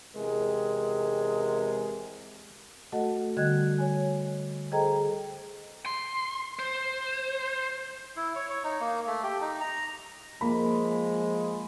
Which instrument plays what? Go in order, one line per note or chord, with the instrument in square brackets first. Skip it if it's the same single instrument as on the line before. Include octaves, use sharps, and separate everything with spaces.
[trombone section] E2 C3 G#3 G#4 A#4
[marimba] A3 F#4 A4 D#5 F#5
D3 G3 F#4 D#5 F#6 G#6
C#5 G#5
G#4 A4 C5 D#5 G5 A#5
[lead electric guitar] C6
C5
[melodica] E4
C#5
C#5
D#4
A#3
A3
G4
D#4
A#5
[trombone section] F3 G#3 [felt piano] A#3 B5